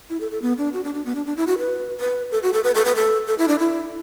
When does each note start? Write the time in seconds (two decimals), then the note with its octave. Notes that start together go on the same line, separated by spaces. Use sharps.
0.10 E4
0.20 A4
0.31 A4
0.42 B3
0.58 D4
0.73 F#4
0.84 D4
0.95 D4
1.05 B3
1.15 D4
1.26 D4
1.37 E4
1.47 F#4
1.58 B4
2.00 B4
2.32 A4
2.43 F#4
2.53 A4
2.64 B4
2.75 A4
2.85 B4
2.96 A4
3.27 A4
3.38 E4
3.48 D4
3.59 E4